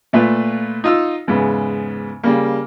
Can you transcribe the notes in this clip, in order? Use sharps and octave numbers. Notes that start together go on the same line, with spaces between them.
A#2 A3 F4 B4 F5
D#4 F4 E6
E2 G#2 C#3 B3
C#3 G3 A#3